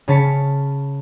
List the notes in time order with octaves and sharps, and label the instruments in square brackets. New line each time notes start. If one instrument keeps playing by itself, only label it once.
[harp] C#3 C#4 A5 B6 C#7